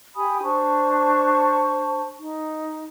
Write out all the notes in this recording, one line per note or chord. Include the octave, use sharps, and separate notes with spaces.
G4 G#5 B5 D#6
D4 C5 A5 C#6
D#4